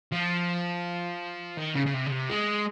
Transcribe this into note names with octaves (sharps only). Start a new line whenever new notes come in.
F3
D#3
C#3
C#3
C3
C#3
C3
G#3